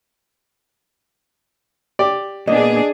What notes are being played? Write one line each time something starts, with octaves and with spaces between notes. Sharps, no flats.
G4 D5
A#2 A#3 B3 D4 G#4 D#5